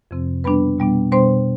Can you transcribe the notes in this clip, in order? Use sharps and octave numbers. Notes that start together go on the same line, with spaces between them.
F2 C3 F3 C4
B2 G3 B3 D4 B4 B5
B2 G3 B3 D4
B2 G3 B3 D4 C5 C6